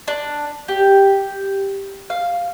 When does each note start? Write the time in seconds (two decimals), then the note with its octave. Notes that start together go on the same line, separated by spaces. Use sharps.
0.08 D4
0.68 G4
2.10 F5